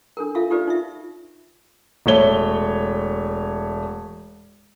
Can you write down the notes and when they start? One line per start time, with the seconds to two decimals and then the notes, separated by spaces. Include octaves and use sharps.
0.17 D4 A4 A#4
0.35 F4 A4 E5 F5
0.50 D#4 F4 G4 A4 B4 D5
0.67 D#4 F4 E5
2.06 E1 A3 C#5 G7